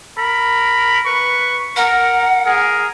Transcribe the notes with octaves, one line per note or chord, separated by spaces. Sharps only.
A#4 B5
B4 C#6
A#4 F#5
G#4 A#4